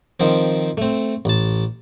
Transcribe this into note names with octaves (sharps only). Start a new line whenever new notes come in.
D#3 F3 C4
A3 C4
A1 A5